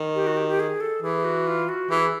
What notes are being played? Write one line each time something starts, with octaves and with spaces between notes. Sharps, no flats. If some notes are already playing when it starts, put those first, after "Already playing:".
Already playing: D#3
G4
F#4
G4
G4
G#4
A4
E3 G#4
F#4
F4
F#4
E3 G#4